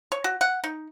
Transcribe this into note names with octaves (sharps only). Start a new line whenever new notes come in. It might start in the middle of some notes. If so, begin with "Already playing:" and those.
C#5
F#4
F#5
D#4